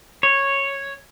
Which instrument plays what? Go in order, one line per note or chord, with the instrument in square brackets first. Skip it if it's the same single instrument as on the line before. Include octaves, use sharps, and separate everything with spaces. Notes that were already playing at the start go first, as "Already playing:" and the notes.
[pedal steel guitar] C#5